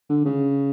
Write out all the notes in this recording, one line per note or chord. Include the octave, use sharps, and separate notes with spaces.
D3
C#3